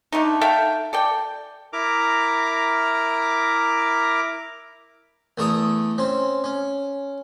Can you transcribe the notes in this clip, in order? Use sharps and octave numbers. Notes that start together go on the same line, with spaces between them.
D3 A3 D#4
A4 E5 F5 G5
A4 D5 G5
E4 A#4 A#5 D6
E2 A3 A#5 C#6 D#6
C4 C#4
C#4